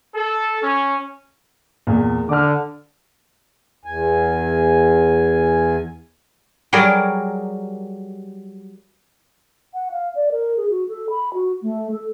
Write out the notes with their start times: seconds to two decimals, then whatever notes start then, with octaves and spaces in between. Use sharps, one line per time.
0.15 A4
0.62 C#4
1.87 E2 A#2
2.29 D3 D6 F6
3.85 E2 G#5
6.73 F#3 G3 G#4 A#4 D5
9.73 F#5
9.91 F5
10.15 D5
10.31 A#4
10.57 G#4
10.70 F#4
10.88 A4
11.10 B5
11.34 F#4
11.62 A3
11.92 A4